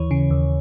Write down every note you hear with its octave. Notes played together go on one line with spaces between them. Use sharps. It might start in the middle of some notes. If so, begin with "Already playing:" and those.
Already playing: D#2 E3 C#5
C#3
D#2